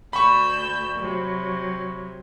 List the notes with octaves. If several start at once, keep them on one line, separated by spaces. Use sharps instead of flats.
D2 B5 C#6 E6 G6
C3 F#3